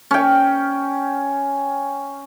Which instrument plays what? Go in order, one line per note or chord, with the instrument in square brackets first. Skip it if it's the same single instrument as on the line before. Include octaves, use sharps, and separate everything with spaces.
[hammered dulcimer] C#4 G5